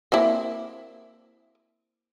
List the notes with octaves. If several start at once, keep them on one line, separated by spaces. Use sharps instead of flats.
A#3 C4 E4